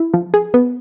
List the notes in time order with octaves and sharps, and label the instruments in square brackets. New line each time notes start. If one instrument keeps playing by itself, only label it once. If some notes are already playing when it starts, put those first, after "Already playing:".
Already playing: [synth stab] E4
F3
G#4
B3